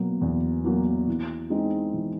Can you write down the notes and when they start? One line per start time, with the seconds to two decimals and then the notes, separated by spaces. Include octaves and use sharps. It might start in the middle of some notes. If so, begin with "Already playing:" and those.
Already playing: B2 F#3 A#3
0.21 E2
0.64 B2 F#3 A#3
1.08 E3
1.50 G#3 C4 D#4
1.94 E3